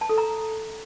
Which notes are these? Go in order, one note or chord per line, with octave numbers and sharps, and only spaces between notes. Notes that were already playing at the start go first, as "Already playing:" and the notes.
A5
A4
A#5